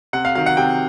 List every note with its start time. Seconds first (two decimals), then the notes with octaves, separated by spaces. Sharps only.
0.13 C3 F#5
0.25 F5
0.35 D#3 F#3 F5
0.46 F#5
0.57 C3 G5